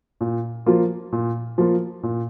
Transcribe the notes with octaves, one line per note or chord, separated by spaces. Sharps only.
A#2
F3 A#3 F4
A#2
F3 A#3 F4
A#2